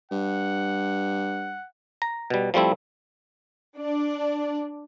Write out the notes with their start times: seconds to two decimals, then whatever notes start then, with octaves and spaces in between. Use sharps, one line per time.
0.11 G2 F#5
2.02 A#5
2.30 B2 G3
2.54 F3 G3 A3 C4 E4
3.78 D4